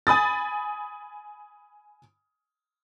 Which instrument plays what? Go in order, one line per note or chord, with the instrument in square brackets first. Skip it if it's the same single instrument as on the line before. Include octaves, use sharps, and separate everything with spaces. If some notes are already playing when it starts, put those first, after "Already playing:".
[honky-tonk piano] G#5 B5 D#6 A6